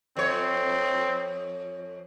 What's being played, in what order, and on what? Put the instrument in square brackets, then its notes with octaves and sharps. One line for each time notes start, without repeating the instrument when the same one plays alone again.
[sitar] F2 C#5 [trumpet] C4